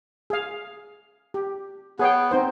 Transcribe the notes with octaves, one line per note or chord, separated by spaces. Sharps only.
G#4 F5
G4
B3 G#4 C#5 G5
C4 D#4 C5